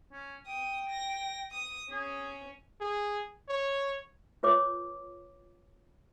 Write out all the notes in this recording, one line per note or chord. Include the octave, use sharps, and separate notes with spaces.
C#4
G5 D#6
A#6
D#6
C#4 G#4
G#4
C#5
F4 B4 C#5 D6